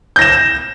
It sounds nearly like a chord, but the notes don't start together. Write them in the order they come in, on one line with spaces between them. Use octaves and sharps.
G6 A#6 E7